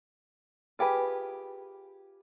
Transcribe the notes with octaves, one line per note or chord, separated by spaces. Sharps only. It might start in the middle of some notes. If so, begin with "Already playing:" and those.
F4 G4 G#4 B4